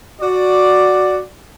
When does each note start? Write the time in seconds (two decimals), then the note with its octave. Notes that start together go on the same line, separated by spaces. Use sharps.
0.21 F#4 D5